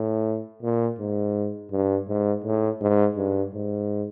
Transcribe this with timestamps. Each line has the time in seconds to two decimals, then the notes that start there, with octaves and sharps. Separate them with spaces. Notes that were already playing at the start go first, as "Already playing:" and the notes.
Already playing: A2
0.63 A#2
0.99 G#2
1.72 G2
2.08 G#2
2.44 A2
2.81 G#2
3.17 G2
3.54 G#2